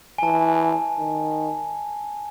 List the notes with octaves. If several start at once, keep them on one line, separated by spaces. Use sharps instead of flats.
G#5
E3 A5
D#3